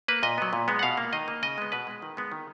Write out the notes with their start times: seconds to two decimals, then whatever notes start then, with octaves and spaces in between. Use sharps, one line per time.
0.08 A#3 B4
0.23 A#2 D#5
0.38 F#3 B3
0.53 A#2
0.68 G#3 B3
0.79 F#5
0.83 B2 F5
0.97 A#3
1.13 D#3 D#5
1.28 A#3
1.43 C#3 D#5
1.58 G#3 B3
1.72 B2 B4
1.87 G#3 B3
2.02 D#3
2.17 G#3 B3
2.32 D#3